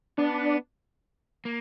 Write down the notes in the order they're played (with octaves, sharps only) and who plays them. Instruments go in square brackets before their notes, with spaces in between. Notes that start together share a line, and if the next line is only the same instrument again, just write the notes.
[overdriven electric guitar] B3 [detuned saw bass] D4
[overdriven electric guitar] A#3